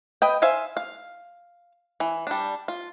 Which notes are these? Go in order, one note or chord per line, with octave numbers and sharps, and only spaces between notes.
B4 D#5 G5
C5 E5 F5 G#5
F5
E3
G3 D4
F4